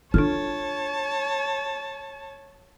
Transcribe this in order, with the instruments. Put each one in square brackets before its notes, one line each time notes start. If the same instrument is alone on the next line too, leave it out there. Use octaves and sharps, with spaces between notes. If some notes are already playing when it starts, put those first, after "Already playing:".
[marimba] D4 A4 F6 [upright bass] F4 [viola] C#5 A5